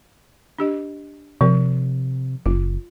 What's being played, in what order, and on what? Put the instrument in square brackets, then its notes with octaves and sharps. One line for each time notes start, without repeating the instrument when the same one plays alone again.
[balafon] D4 G4 D#5
[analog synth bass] C3 [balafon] F3 A#4
[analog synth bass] F#1 [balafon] F4